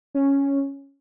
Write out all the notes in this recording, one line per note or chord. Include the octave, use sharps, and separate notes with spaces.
C#4